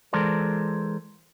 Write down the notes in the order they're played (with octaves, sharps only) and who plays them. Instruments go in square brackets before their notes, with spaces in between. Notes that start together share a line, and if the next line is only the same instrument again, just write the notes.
[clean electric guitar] E3 G#3 A4 A#4 C5 D5